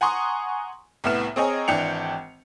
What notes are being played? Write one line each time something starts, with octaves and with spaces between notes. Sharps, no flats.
F#5 G#5 A#5 C6 C#6 D#6
C2 A2 B3 F6 E7
C4 G#4 C#5 D#5 G#5 A#5
G#1 E3 D4 G5 C#7 F7